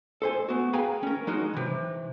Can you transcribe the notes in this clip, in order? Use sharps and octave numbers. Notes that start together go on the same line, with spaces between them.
A4 C5 G#5
B3 F#4
G#4 B4 F5 G5 G#5 A#5
C#4 A#4
F#3 G#3 D#4 F#4
C3 E3